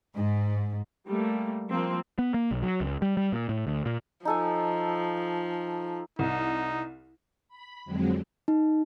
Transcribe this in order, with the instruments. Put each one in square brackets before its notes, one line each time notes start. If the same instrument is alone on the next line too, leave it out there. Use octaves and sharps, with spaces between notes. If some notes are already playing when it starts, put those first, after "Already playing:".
[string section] G#2
[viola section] G3 A3 A#3
F3 A#3 C4
[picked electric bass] B3
A#3
B1
F#3
C#2
G3
G3
A#2
A2
D2
A#2
[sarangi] F3 [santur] D#4 A4 G#5
[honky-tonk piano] C2 [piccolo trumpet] D#4
[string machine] B5
F2 D3 F#3 G#3 C4
[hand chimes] D#4